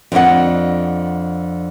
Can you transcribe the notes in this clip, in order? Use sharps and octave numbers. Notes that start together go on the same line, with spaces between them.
F2 D3 D5 D#5 F#5